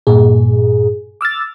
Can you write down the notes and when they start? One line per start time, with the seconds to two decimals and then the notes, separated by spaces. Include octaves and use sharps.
0.07 G2 A#2 G#4
1.21 D6 E6 F6 A6